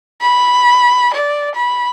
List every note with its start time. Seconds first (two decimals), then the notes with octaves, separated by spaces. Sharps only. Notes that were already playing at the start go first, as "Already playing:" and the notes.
0.22 B5
1.13 D5
1.55 B5